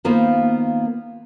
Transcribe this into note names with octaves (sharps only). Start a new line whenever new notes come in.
D#3 A#3 B3 F4 B4 C5